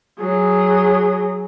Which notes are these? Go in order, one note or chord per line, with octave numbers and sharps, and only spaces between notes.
F#3 G#4